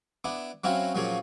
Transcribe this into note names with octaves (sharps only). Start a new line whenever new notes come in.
B3 D4 E4
F#3 C4 C#4 E4 F#4 F5
A#2 F3 F#3 A#3 C#4 G#4